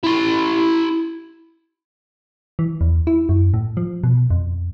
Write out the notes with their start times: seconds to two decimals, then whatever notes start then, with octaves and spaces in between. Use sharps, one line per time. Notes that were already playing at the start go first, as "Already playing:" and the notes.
0.03 E4 C6
2.59 E3
2.81 E2
3.07 E4
3.29 F#2
3.54 A2
3.77 F3
4.04 B2
4.30 F2